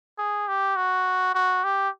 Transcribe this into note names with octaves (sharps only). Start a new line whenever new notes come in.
G#4
G4
F#4
F#4
G4